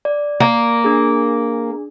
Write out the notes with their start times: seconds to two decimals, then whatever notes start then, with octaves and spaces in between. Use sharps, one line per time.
0.05 D5
0.40 A#3
0.84 D4 G#4